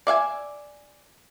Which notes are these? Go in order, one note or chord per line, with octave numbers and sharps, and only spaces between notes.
D5 E5 F5 G#5